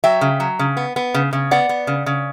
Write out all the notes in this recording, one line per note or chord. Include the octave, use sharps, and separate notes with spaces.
F#3 E5 G5
C#3
F#3
C#3
B3
B3
C#3
C#3
B3 D5 F#5
B3
C#3
C#3